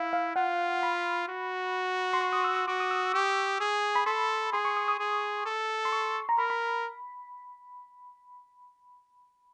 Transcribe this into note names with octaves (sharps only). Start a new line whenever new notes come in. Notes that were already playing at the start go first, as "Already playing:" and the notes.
Already playing: E4 F5
F5
F4 F#5
B5
F#4
C6
C#6
D#6
E6
E6
F#4 D6
D#6
E6
G4 C#6
G#4
B5
A4 C6
G#4 C6
C#6
D#6
D#6
G#4
A4
C6
C#6
A#5
A#4 B5
B5